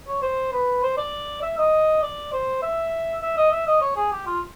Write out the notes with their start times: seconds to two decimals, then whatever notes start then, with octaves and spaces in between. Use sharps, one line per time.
0.08 C#5
0.22 C5
0.53 B4
0.83 C5
0.98 D5
1.42 E5
1.58 D#5
2.02 D5
2.33 C5
2.62 E5
3.22 E5
3.37 D#5
3.51 E5
3.67 D#5
3.81 C#5
3.97 G#4
4.12 G4
4.26 F4